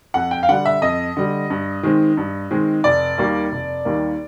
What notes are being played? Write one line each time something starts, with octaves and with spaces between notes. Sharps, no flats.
F2 F#5
G5
F5
D3 G3 F#5
E5
F2 D#5
D3 G3
G2
D#3 G#3 C4
G2
D#3 G#3 C4
F1 D5
D#2 D#3 G3 A#3
F1
D#2 D#3 G3 A#3